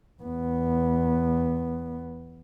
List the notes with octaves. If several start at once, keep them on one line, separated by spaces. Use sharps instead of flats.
E2 B3